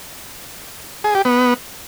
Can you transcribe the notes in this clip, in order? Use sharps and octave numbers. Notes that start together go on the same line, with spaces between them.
G#4
G4
B3